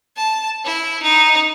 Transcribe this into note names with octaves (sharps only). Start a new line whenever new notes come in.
A5
E4
D#4